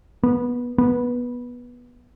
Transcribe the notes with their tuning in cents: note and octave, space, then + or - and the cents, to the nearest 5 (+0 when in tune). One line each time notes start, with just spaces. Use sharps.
B3 -20
B3 -15